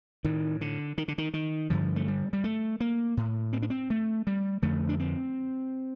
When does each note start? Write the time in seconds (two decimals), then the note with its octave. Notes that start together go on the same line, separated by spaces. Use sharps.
0.25 A2 D#3
0.61 D3
0.98 D#3
1.08 D3
1.18 D#3
1.34 D#3
1.70 G2 D3 F3
1.96 A3
2.08 G3
2.33 G3
2.44 A3
2.80 A#3
3.17 A2
3.53 C4
3.62 D4
3.70 C4
3.90 A3
4.27 G3
4.62 F2 D3 A3
4.89 D4
5.00 C4